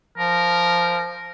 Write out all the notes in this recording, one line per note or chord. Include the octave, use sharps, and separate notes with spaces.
F3 A#4